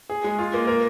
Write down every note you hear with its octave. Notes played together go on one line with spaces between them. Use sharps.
G#4
G#3
F4
A#3
A#4